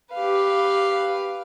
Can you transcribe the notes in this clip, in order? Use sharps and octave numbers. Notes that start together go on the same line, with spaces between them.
G4 B4 F5